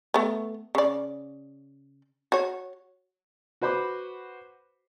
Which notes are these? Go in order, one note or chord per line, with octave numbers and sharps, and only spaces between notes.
A3 B3
C#3 D5
F#4 C#5
F#4 B4 C5 B5 D6